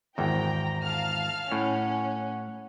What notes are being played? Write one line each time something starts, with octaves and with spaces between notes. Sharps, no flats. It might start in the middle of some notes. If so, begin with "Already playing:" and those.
G#1 E2 G5 A#5
F5 A5 F6
A2 C#4 F#5